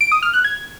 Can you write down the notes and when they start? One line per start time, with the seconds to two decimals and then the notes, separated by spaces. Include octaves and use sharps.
0.01 D7
0.12 D#6
0.23 F6
0.34 F#6
0.44 G#6